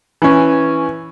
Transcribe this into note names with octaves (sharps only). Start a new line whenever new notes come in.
E3 C#4